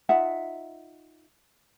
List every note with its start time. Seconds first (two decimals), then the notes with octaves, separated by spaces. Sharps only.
0.09 D#4 F4 E5 F#5